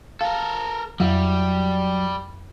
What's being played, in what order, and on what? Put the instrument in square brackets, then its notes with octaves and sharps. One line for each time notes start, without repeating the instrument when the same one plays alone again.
[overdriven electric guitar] A4 A#4 [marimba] F5
[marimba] F2 [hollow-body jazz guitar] F#3 E5 [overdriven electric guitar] G3